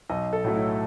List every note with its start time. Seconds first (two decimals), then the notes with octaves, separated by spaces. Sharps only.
0.09 B1 D#5
0.33 A4
0.44 A2 F#3 A3
0.55 E4